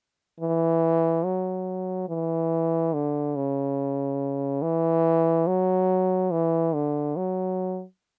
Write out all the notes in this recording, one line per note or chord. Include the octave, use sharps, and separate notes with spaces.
E3
F#3
E3
D3
C#3
E3
F#3
E3
D3
F#3